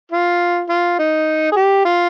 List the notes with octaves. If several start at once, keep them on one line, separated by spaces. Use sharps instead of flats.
F4
F4
D#4
G#4
G4
F4